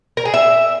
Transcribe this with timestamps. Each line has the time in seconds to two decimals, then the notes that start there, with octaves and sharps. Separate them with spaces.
0.17 A#4
0.25 G#4
0.34 E5